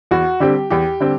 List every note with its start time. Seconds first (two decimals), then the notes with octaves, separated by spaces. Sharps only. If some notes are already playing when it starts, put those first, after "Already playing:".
0.11 E2 F#4
0.40 D3 G3 C4 G4
0.70 E2 G4
1.00 D3 G3 C4